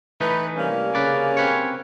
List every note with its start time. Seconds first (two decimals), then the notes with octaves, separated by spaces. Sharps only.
0.21 E3 A3 D#4 B4
0.57 C3 G3 A#3 C#4
0.95 C#3 B4 D5
1.37 C4 B4 C#5